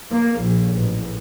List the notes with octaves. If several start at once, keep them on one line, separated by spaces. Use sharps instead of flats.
A#3
A#1
A1